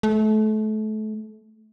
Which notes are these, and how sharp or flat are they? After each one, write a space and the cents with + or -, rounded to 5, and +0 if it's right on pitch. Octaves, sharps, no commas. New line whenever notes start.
A3 -30